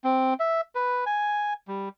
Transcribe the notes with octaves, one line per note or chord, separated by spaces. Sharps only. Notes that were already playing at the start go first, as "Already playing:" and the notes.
C4
E5
B4
G#5
G3